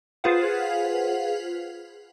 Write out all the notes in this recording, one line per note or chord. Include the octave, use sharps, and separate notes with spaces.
F4 G#4 B4 C5 F5 F#5